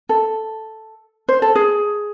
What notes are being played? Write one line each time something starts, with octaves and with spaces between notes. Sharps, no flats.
A4
C5
A4
G#4